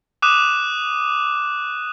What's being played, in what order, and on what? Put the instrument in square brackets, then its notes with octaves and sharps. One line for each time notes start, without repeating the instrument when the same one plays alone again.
[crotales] D6 D#6 F#6 D#7 E7